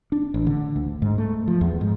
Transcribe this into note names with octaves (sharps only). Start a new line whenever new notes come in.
D4
A1
D3
D2
G#2
A3
F3
E2
G#2